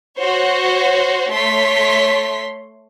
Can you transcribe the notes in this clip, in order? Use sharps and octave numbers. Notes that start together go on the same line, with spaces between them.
F#4 C5 C#5
A3 C#5 C6 B6